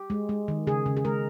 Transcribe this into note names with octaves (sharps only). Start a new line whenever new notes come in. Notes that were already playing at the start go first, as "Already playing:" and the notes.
Already playing: G4
G#3
G#3
D#3
C#3 G#4
C#3
G#4
G#3 A#4